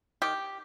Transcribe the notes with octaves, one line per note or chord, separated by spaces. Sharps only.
D#3 G4